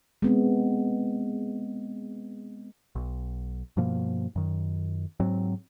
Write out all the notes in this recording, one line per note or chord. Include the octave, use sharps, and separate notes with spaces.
G#3 B3 C4
B1
G2 B2 F3 A#3
F#2 D#3
G#2 F#3 C4